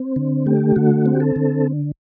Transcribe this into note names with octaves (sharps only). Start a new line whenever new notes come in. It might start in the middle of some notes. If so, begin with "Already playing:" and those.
Already playing: C4
D3
A3 G4
D3 F#4
C4
G4
A4
D3